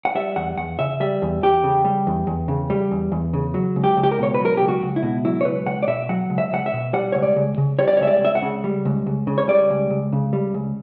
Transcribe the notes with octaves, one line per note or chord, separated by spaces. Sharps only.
F#5
G3 E5
E2 F#5
E2 F#5
C#3 E5
G3 E5
E2
E2 G4
C#3
G3
E2
E2
C#3
G3
E2
E2
C#3
F#3
C#2
G4
C#2
G4
A#4
B2 C#5
B4
F#3 A#4
C#2 G4
F#4
C#2
E4
B2
F#3 E4
C#5
C#2 B4
C#2 F#5
D5
B2 E5
F#3 F#5
C#2
E5
C#2 F#5
E5
B2
G3 F#5
C#2 C#5
D5
C#2
C#3
G3 C#5
D5
C#5
C#2 E5
D5
C#2 E5
F#5
C#3
G3
C#2
C#2
C#3
C#5
G3 D5
C#2
C#2
C#3
G3
C#2